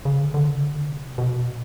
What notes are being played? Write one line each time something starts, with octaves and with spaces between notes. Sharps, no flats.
C#3
D3
D3
C#3
D3
C3
B2
A#2